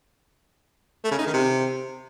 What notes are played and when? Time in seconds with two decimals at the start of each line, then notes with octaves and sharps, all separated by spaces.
1.04 A3
1.11 C#3
1.19 D#4
1.26 D#3
1.34 C3